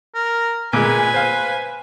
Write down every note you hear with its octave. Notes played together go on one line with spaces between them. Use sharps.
A#4
A#2 G#3 B4 G#5
C5 F5